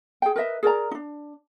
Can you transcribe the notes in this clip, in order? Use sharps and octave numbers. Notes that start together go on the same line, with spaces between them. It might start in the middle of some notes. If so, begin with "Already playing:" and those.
G#4 G5
A#4 B4 D#5 E5
G#4 A#4 D5 A#5
D4 D#4